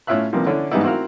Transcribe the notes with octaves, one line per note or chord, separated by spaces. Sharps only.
A2 C#4 E4 F4 E5 F#6
C3 E3 F3 G3 A#3
D3 C#4 D4 E4
G#2 E3 G3 B3 D#4 E4
C4 E4 F#4 A#4 F5